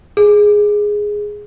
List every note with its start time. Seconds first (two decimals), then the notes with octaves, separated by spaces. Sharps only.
0.17 G#4